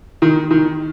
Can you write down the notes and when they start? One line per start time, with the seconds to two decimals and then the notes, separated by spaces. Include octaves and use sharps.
0.22 D#3
0.51 D#3